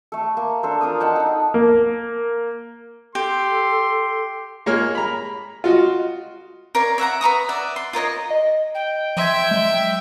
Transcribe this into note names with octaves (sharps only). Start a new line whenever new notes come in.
A3 A4
A#3
D4 A4 C5
F4 A#4 D6 D#6
D#4 F#5 G5 A5
D#4 A4
A#3
G4 A4 C6
G#3 A#3 A#4 C#5 F6
A#5 B5
F4 F#4 D#5
A#4 C#5 D5 F5
C#5 E5 F#5 A#5
B4 A#5 C#6 D#6
D5 E5 F#5
C6
F4 A#4 C#5 D#5
D#5
G5
F3 E5 C6 G#6
F#3 G#3